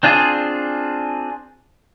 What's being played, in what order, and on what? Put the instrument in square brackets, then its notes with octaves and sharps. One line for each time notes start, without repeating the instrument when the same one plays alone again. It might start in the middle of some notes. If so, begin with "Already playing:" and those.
[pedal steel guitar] C4 D4 F4 G#4